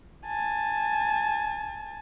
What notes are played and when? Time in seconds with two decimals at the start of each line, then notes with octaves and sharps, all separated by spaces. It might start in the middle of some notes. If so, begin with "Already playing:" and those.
0.27 G#5 A5